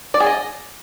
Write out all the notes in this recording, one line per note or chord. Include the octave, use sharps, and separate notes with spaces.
D5
G#4
D#5